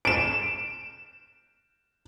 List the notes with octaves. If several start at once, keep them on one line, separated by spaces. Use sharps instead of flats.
D7 E7